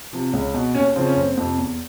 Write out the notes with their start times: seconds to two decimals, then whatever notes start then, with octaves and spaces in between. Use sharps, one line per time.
0.13 C3 F3
0.33 C#2
0.54 B2
0.75 D#2 C#4
0.96 C#3 F3 C4
1.06 C#4
1.16 F#1 C4
1.37 F2 C3
1.58 E2